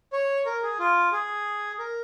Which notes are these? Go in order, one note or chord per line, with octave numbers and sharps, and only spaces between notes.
C#5
A#4
G#4
F4
G#4
A#4